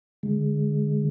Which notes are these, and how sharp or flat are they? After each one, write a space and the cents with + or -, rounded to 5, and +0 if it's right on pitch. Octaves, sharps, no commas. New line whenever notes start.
D3 +0 G#3 +0